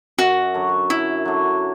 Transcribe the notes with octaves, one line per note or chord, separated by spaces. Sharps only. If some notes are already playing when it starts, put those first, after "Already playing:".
F#2 F#4
D3 F#3
F#2 E4
D3 F#3